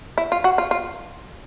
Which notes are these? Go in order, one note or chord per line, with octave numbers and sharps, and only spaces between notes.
E4
F4
F#4
F4
F4